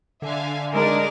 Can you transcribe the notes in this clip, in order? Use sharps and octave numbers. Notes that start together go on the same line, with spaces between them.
D3 E5 F5 G#5
G#3 D4 D#4 A#4 D5